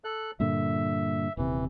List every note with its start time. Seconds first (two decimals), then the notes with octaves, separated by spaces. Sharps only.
0.04 A4 F#6
0.40 G2 A#2 D3 E5
1.37 D#1 C3 E3